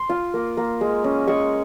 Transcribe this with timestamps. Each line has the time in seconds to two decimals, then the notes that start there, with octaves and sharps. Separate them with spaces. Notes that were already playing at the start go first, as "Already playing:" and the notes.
Already playing: C6
0.09 F4
0.34 A#3
0.57 A#3
0.81 G#3
1.04 C#4
1.27 G#3 C#6